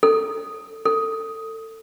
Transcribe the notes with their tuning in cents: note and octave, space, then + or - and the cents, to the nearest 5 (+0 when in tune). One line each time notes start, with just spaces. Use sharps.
A4 +15
A4 +25